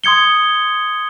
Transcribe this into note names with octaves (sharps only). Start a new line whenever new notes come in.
C6 D#6 G#6 C#7 G7